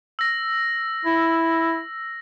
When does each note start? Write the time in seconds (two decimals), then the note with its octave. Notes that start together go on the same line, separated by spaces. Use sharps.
0.19 E6 A#6
1.05 E4